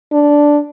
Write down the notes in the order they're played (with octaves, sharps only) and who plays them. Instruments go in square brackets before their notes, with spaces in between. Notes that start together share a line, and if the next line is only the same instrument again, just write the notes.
[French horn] D4